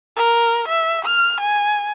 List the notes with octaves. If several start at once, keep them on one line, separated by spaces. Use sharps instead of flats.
A#4
E5
F6
G#5